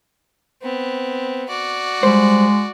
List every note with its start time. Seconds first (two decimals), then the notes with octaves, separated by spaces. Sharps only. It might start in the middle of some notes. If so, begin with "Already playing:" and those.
0.62 B3 C4
1.49 F#4 D5
2.03 G3 G#3 C5